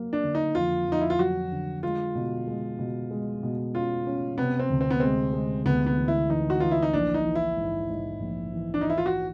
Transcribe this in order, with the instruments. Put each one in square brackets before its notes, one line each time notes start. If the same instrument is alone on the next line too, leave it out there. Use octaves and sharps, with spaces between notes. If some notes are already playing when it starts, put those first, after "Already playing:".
Already playing: [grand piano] F#3 A#3
[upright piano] D4
[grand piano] D3
[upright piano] D#4
[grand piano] F2 [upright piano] F4
[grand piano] F2
[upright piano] D#4
E4
F4
[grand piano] F#3 [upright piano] F#4
[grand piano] D3
[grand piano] G#3 [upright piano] F4
[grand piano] B2
G#3
B2
G#3
B2
[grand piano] C#4 [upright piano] F4
[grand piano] C#4
[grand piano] C3 [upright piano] B3
[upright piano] C4
[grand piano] D2
[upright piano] C4
B3
[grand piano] G#3 [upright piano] C4
[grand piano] G#3
[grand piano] D2 [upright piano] B3
[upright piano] B3
[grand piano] E3
[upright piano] E4
[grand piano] E3 [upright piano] D#4
[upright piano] F#4
[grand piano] E3 [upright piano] F4
[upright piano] E4
D#4
[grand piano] A#1 [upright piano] D4
[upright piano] D#4
[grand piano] E3
[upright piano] E4
[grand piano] G#2
G#2
A#1
E3
[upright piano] D4
D#4
[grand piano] E3 [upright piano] E4
[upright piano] F4
F#4